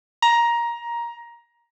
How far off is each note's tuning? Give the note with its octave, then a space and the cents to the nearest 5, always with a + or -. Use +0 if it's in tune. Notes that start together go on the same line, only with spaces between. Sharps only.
A#5 +15